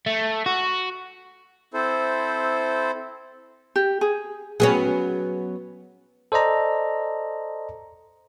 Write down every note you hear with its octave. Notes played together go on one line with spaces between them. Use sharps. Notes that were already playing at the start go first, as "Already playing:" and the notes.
A3
F#4
C4 E4 A4 C5
G4
G#4
F#3 B3 C#4 G#4
A4 C5 D5 D#5 A#5